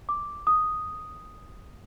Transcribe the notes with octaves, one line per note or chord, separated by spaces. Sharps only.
D6
D#6